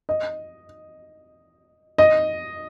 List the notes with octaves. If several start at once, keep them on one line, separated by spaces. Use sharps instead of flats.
D#5
D#5